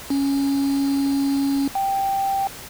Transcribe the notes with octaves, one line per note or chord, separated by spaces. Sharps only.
C#4
G5